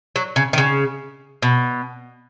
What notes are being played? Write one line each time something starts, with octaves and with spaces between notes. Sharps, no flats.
F#3
C#3
D#3
C#3
B2